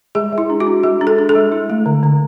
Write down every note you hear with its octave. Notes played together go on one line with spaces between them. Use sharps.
G#3 G#4
G#3
E4
D4
F#4
D4
G#3 G#4
D4
A4
D4
A4
G#3
E4
A3
D3
D3